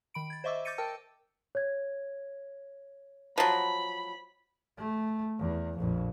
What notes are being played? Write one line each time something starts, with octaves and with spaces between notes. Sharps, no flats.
D#3 B5 D7
G#6 A6
C5 D#5 E5 C#6 D6 E6
D6 G6 A6 A#6 C#7 D#7
A#4 G5 A5 E6
C#5 G#6
F3 F#3 B5
A3
E2
A#1 F2